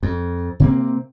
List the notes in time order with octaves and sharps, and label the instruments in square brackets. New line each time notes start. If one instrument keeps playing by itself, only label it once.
[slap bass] F2
C3 A#3 C4